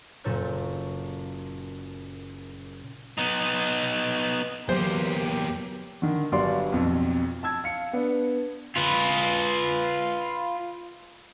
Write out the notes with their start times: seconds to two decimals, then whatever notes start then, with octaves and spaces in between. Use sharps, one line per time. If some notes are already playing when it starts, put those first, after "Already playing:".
0.24 F#1 A#2 A4 C#5 G6
3.18 B3 D#4
4.69 E2 F#3 A#3 B3 G4 C5
6.02 D3 D#3
6.32 G1 F#3 G3 D5 F5 C6
6.72 B1 F2
7.43 A5 E6 G#6
7.64 F5 C#7
7.93 B3 D4
8.77 F4 B4